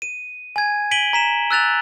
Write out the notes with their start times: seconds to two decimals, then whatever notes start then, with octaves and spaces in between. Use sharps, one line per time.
0.02 D#7
0.56 G#5 G#6
0.91 B6 D7 D#7 F#7 G7
1.13 A#5 B6 E7
1.51 E6 F#6 A6 F7